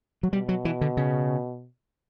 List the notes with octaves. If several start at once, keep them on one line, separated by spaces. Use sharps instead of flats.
F#3
B2 G3
F#3
E3
D3
C#3